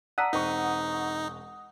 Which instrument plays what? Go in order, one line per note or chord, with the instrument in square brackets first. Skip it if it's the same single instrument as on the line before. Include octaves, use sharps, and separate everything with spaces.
[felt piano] D5 A5 E6 [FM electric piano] F#5 D#6 [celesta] A#5 B6 D#7
[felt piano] E1 C4 C#6 [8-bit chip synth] D#4